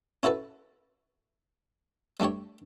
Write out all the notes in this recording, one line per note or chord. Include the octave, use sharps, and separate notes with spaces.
C#4 E4 F#4 A4 B4
G3 A3 D4 G4 C#5